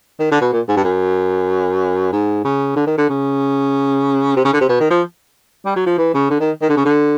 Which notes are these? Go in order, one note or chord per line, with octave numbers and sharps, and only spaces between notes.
D#3
D3
B2
A#2
G#2
G2
F#2
G#2
C#3
D3
D#3
D3
C#3
C3
C#3
D3
C3
B2
D#3
F3
G3
F#3
F3
E3
C#3
D3
D#3
D#3
D3
C#3
D3